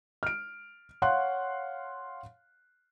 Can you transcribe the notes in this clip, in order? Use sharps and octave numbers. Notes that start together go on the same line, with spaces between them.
F6 D7
C#5 F5 F#5 C6 F#6